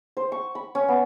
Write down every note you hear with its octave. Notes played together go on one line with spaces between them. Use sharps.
C5
C#6
B5
C#4
B3